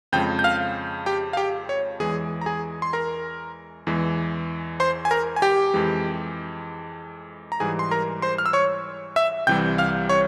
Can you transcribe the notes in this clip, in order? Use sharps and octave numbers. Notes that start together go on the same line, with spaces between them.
F2 C#3 F3 G#3 G5 G6
G6
F5 F6
G4 G5
F5
G4 G5
C#5
E2 E3 G#3 G#4 G#5
A#5
G#4 G#5
C6
A#4 A#5
E2 E3 G#3
C5 C6
G#5
A#4 A#5
G#5
G4 G5
F2 E3 G#3
A#5
G#2 E3 G3 G#4 G#5
C6
A#4 A#5
C5 C6
F6
E6
C#5 C#6
E5 E6
C2 C3 E3 G3 G5 G6
F5 F6
C#5 C#6